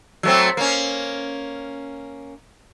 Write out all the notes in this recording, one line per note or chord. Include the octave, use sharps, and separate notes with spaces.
F#3 A3 C4
A#3 C#4